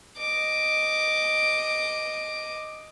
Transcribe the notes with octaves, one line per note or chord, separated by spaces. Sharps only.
D#5 D6